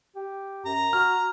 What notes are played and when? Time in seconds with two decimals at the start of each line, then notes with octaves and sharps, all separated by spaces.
0.16 G4
0.66 F#2 A#5
0.93 F#4 F6